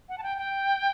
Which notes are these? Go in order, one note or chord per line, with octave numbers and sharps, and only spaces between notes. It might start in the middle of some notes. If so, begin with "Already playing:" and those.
F#5
A5
G5
G5